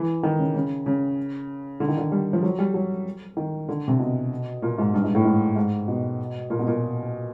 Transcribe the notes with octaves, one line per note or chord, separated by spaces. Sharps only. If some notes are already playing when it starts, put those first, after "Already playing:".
Already playing: E3
D#3
C#3
C#3
C#3
D3
D#3
D3
G3
F3
F#3
G3
F#3
D#3
D3
C3
B2
A#2
G#2
G2
G#2
A2
G#2
G#2
B2
A#2
B2
A#2